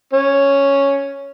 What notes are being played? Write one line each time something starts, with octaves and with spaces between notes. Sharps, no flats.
C#4